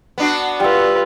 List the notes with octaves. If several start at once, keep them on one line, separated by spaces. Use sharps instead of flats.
B3 D4 F#4
G3 F4 B4 E6